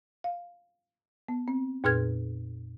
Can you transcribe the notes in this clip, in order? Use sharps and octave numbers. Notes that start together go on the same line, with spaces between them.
F5
B3
C4
F2 A#2 G#4 B4 F6 G#6